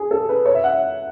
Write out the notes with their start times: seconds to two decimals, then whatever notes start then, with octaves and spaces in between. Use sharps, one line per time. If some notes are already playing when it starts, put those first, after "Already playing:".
Already playing: G#4
0.11 A4
0.29 B4
0.46 C#5
0.55 E5
0.64 F#5
0.72 E5